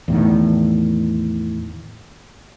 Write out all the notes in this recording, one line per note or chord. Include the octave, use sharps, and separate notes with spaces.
E2 A2 D#3